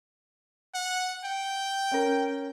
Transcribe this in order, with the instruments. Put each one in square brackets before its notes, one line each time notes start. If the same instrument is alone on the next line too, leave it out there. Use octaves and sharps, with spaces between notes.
[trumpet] F#5
G5
[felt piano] C#4 A#4